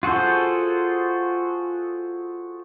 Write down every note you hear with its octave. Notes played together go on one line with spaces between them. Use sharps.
F4 F#4 G#4 A4 C5